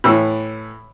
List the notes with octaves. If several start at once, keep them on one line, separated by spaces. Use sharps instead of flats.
A2 E3